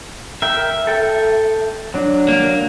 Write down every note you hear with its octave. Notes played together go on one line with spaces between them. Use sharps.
A#4 E5 G5
A4 G5
F#3 D4
A#3